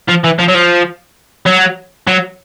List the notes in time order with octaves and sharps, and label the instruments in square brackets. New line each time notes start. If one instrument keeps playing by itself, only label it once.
[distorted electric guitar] F3
E3
F3
F#3
F3
F#3
F#3